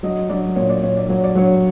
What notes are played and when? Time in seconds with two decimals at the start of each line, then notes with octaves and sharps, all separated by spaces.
0.03 F#3 D#5
0.29 F#3 D5
0.56 A#2 C#5
0.69 D5
0.83 A#2 C#5
0.97 D5
1.09 F#3 C#5
1.24 D5
1.35 F#3 C#5